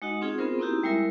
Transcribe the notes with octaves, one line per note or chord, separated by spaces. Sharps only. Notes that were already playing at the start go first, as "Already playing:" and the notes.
G#3 D#4 F#4 D#5 F#5
C4 C#4 D#4 F4 G#4
B3 C4 F4 G#4 A#4 C5
A#3 C4 D#4 E4 F#4 G4
G3 G#3 E4 A#4 E5